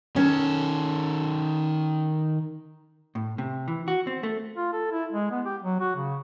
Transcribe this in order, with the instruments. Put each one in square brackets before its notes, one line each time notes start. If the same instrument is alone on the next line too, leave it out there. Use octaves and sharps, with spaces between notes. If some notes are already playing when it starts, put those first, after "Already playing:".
[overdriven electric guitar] D#3 A4 [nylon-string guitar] C#4
[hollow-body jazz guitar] A2
C3
E3
F#4
C4
A3
[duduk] F4
A4
E4
G#3
B3
G4
F#3
F#4
C#3